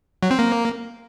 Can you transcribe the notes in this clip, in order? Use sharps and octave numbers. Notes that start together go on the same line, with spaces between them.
F#3
C4
A#3